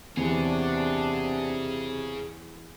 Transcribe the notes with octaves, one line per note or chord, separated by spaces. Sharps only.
E2 C3 B3 D4 G#4 C#5